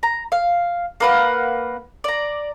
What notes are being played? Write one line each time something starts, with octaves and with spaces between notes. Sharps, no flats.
A#5
F5
A#3 B4 F#5
D5 A#5